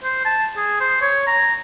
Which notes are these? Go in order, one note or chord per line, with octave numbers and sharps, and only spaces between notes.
C5
A5
G#4
C5
C#5
A#5